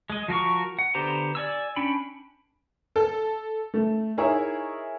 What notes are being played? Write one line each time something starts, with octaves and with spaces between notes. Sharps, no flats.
G#3 D#5
F3 F#4 A#4 C#6
F#5
D3 B3 G4 C5 A#5
D5 G#5 E6
C#4 D4 G5 B5
A4
A3
D#4 E4 G#4 A#4 C#5 E5